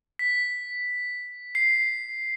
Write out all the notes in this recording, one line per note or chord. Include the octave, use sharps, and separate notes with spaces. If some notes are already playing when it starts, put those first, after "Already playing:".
B6
C7